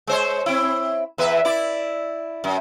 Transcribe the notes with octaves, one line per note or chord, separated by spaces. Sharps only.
G#3 C5 C#5
C4 E4
E2 B4 E5
E4 D5
F#2